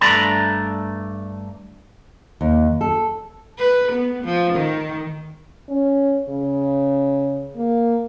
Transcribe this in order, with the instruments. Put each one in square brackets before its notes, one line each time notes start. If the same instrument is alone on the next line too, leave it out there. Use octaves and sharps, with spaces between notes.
[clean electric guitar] G2 A3 D4 D5 A#5 B5
[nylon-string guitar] D#2
A4
[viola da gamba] B4
B3
F3
D#3
[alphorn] C#4
C#3
A#3